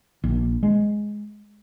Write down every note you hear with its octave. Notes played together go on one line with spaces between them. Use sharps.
A#1
G#3